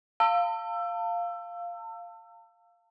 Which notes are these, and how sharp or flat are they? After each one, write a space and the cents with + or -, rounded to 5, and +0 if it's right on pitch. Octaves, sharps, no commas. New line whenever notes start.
F5 +0 A5 +40 E6 +20